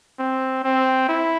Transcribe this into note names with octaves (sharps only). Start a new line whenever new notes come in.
C4
C4
E4